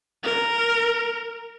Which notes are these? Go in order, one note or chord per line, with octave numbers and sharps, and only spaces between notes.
A#4